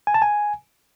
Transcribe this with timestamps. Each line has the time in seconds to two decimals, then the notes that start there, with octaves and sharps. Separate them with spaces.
0.07 G#5
0.14 A5
0.22 G#5